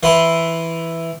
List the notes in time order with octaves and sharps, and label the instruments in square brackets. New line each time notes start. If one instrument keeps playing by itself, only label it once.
[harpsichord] E3 B4 C6